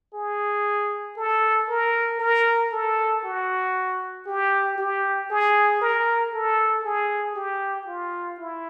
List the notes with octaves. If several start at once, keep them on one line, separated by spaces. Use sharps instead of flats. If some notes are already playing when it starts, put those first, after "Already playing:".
G#4
A4
A#4
A#4
A4
F#4
G4
G4
G#4
A#4
A4
G#4
G4
F4
E4